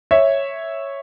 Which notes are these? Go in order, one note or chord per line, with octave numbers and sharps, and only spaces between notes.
C#5 E5